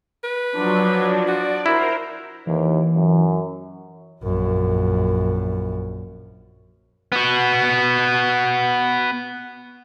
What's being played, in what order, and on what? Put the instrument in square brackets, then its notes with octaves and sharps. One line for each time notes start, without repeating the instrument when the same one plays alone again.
[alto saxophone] B4
[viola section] F3 D4 [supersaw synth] F#3
[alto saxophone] F#4 [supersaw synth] D5
[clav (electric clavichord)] E4 [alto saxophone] F#4 [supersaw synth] A#4 C5
[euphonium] D#2 [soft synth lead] E3
[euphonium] F#2
[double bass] A#1 F#2
[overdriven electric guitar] B3 F#4